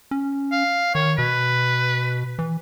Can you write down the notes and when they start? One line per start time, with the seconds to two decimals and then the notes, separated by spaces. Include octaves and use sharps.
0.11 C#4
0.52 F5
0.95 D#3 C#5
1.18 B2 B4
2.39 E3